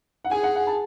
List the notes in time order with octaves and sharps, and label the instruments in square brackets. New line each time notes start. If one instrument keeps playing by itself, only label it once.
[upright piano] F#5
[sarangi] G#4 [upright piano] G#5
[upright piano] F#5
F#5
A5